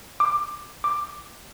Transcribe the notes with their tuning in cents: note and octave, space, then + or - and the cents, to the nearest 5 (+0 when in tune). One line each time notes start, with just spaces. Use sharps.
D6 +15
D6 +10